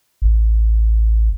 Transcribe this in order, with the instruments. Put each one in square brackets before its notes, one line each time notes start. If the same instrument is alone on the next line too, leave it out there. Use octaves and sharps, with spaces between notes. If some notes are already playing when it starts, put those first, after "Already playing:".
[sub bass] A1